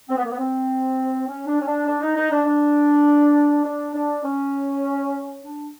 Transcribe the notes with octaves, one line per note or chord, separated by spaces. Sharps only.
C4
B3
A#3
B3
C4
C#4
D4
C#4
D4
D4
D#4
D#4
D4
D4
D4
D4
C#4
D4